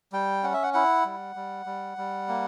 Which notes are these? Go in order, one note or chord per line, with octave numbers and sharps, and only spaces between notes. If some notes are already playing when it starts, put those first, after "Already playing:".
G3 G5
C#4 F#5
E5
F#5
E4 F#5
G3
G3
G3
G3
A#3